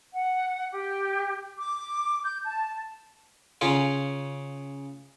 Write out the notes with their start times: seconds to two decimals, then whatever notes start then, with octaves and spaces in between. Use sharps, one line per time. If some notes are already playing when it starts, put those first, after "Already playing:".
0.14 F#5
0.72 G4
1.58 D6
2.23 G6
2.44 A5
3.61 C#3 C#4 F4